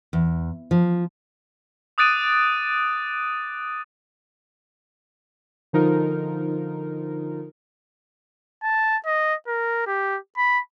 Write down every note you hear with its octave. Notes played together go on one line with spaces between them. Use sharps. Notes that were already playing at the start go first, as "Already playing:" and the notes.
E2
F3
D6 D#6 F#6 A6 D7 D#7
D3 F3 D#4 F4 A#4
A5
D#5
A#4
G4
B5